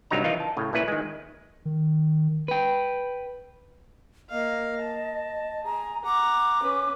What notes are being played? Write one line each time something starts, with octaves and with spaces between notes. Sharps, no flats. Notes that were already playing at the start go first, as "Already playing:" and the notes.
C2 G2 F#3 D#4 A#5
D#3 E3 D#4 F4
A5
A2 C#3
A#2 C#4 E4 B4
D#3 G#3
D#3
B4 G5
A#3 D#5 F5
A5
G#4 A#5
F#5 A#5 D6
C#4 B4